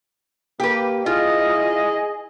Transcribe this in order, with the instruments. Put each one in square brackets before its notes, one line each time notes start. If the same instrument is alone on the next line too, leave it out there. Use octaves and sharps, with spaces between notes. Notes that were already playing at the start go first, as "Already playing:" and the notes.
[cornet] A#3 [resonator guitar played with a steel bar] G4 B4
[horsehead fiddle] E4 D#5 [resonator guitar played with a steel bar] F4 [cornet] G#4